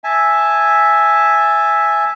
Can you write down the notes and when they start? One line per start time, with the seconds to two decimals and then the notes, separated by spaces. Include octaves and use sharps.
0.04 E5 G#5 A5